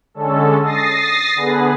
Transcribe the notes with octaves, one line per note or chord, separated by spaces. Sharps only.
D3 G#3 C#4 A4
D#6 A6 A#6 C7
D3 B3 G#4 B4